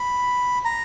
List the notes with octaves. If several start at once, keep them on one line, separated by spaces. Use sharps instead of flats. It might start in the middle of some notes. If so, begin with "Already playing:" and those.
Already playing: B5
A#5